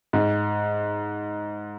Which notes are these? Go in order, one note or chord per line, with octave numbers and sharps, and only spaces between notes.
G#2